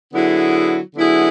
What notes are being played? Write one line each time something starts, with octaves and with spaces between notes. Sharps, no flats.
D3 F#3 B3 E4 G#4
D3 F#3 B3 E4 G#4